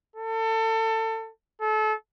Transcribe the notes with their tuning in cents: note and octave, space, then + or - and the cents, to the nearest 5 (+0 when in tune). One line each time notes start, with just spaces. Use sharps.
A4 +25
A4 -30